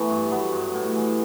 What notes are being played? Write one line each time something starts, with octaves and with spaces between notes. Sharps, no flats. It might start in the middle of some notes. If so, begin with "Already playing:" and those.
Already playing: E3 A3 B3
G2
F#3 B3
G2
A2
E3